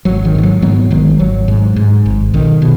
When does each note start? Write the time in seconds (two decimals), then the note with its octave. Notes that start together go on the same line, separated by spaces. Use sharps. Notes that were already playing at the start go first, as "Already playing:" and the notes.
0.05 G#1 F#3
0.25 D#3
0.35 G#2 D#3
0.43 F#3
0.62 G#2 F#3 B3
0.91 G#1 D#3 G#3
1.19 G#1 F#3
1.48 G#2
1.76 G#2
2.06 G#1
2.34 B1 D#3
2.62 B2